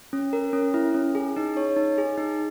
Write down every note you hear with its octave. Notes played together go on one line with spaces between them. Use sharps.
C#4
A#4
C#4
E4
C#4
G#4
D#4
C#5
D#4
G#4
D#4